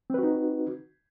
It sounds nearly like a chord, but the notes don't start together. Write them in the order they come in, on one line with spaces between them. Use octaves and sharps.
C4 B4 F#4 D#4